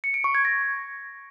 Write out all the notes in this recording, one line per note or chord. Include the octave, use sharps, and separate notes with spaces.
C#7
D7
C#6
G#6
A#6